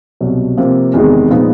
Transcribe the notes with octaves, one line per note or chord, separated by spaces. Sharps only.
C2 B2 F#3
C3 F3 A#3
E2 C3 D#3 G#3
A#2 F3 G#3 B3 D#4